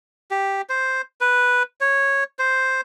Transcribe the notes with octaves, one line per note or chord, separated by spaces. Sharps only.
G4
C5
B4
C#5
C5